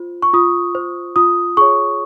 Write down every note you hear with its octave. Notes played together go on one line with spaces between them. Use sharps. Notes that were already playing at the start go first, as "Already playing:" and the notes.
Already playing: F4 C5
C#6
F4 D#6
C5
F4 D#6
G#4 C#5 C#6